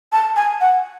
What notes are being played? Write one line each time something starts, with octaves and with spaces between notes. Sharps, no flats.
A5
G#5
F#5